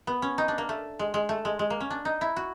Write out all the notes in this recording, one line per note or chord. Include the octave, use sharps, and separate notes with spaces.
B3
C#4
D#4
D4
A#3
A3
G#3
G#3
A3
G#3
G#3
A#3
C#4
D4
D#4
E4
F#4